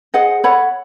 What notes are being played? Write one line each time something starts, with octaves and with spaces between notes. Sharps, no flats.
G#4 C5 D#5 F#5
A4 C#5 F#5 B5